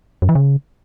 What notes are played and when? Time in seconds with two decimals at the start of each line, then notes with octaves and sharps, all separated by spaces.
0.22 F#2
0.29 E3
0.35 C#3